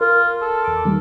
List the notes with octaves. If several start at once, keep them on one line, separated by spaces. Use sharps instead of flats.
F4 A#4
A4
E2 D6
D#3 G3 A#3